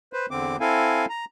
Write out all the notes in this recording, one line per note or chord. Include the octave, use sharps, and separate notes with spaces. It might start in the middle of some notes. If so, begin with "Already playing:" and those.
B4 C5
E2 D3 C4 D6
C4 E4 A4 F5 G#5
A#5